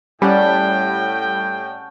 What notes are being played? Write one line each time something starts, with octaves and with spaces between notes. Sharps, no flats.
A2 G3 C#4 F#5 G5 A5